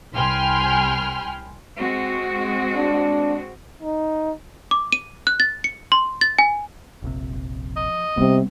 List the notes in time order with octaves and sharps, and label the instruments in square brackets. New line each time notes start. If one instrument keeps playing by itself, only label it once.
[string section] C2 G5 G#5 B5 C6 F6
[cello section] G#3 C4 F#4
[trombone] D4
[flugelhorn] D#4
[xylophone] D6
D#7
F#6
A6
C#7
C6
A6
G#5
[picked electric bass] F1 A#1 C3
[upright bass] F3
[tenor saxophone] D#5
[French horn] C3 [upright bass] G3 E4 [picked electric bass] B3 C4